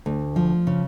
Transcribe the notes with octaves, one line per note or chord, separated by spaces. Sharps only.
D2
F3
C#3